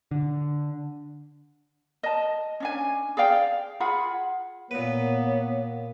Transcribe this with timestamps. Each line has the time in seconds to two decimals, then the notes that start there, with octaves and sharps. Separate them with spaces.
0.11 D3
2.03 D#5 A5
2.60 C#4 D4 G#5
3.17 G#4 D5 F5 G5
3.80 F4 G#4 F#5 B5
4.71 A#2 A#3 B3 B4 C#5